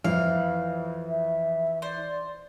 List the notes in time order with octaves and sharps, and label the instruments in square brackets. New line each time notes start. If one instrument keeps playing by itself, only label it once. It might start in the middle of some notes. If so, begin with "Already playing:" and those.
[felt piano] F2 [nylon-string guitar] E3 [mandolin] F5
[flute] E5
[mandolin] C5 [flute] D5